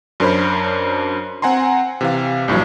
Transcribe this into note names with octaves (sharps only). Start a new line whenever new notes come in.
F#2 D4 A#4 C5 C#5 B5
C4 F#5 G#5 A#5 C6
C3 E3 F5
A#1 G2 E3 F#3